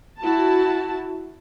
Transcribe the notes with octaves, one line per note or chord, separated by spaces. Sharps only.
E4 F#4 A5